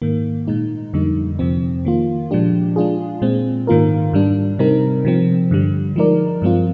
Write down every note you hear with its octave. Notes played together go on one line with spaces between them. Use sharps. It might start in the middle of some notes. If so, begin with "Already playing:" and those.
G#2 D#3 A#3
A#2 G#3 D#4
F2 D3 G3 A#3 D#4
F2 C3 F3 C4
D#3 A#3 F4
A#2 F3 G#3 D4 G4
G#3 D4 F4 G#4
A#2 G#3 C4
G#2 D#3 A#3 F4 A#4
G#2 G3 D4
C3 G3 C4 D#4 A#4
C3 F3 C4
G2 D3 G3
F3 G#3 D#4 A#4 D5
G2 F3 G#3 C4 F4